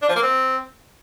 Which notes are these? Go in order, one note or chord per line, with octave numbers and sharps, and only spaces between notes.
D4
F3
A#3
C4